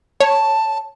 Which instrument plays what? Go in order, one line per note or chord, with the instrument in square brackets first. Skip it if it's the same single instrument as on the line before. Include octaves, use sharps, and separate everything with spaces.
[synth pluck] C#5 [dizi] A5